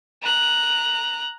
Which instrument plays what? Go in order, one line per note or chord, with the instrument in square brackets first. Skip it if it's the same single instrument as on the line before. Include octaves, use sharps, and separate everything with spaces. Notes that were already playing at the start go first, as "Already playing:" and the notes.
[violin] A#5 F#6